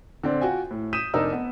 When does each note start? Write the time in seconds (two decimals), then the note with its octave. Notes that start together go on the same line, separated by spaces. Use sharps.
0.23 D3 C4 D5
0.41 F4 F#4 G5 G#5
0.71 A2
0.93 D#6 G6 B6 D#7 E7
1.14 F1 D4 D#4 A#4 E6
1.32 B3